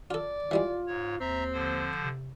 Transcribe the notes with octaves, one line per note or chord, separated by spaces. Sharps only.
F4 A4 D5
E3 G3 G#3 F4
G#2 C#5
D#2 C4 E5 A#5
D3 F3 C5
C3